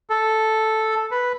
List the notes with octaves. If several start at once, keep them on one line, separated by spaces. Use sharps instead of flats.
A4
B4